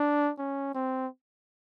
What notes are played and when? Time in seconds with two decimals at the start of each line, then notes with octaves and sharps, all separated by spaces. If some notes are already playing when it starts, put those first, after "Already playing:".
Already playing: D4
0.38 C#4
0.75 C4